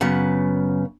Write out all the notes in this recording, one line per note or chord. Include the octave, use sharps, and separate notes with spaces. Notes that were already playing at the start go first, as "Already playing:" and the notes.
F#2 C#3 B3 F#5